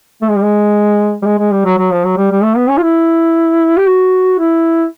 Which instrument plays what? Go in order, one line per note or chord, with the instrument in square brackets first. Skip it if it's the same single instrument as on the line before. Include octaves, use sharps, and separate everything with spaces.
[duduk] A3
G#3
G3
G#3
G3
G#3
G#3
G3
F#3
F#3
F3
F#3
G3
G3
A3
B3
C#4
F4
E4
G4
F#4
E4